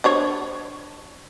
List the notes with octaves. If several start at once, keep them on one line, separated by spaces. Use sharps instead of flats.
D4 C5 C#5